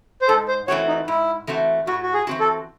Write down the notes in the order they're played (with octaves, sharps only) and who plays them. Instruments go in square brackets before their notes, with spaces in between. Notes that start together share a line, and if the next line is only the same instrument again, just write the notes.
[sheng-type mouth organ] C5
[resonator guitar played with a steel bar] G#2 [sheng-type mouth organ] A4
[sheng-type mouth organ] C5
[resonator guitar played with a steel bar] E3 A3 C4 F#4 [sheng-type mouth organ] C#5
[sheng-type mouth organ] D#4
[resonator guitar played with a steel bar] G#2 [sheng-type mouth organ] E4
[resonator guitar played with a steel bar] E3 A3 C4 F#4
[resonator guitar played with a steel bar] A2 [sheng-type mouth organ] F#4
[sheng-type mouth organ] F#4
G#4
[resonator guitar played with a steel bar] E3 C4 F#4
[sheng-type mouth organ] A4